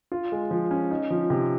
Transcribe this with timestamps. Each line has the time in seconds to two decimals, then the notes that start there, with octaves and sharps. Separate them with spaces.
0.12 F4
0.32 G#3
0.51 F3
0.71 C#4
0.90 D#4
1.11 F3
1.30 C3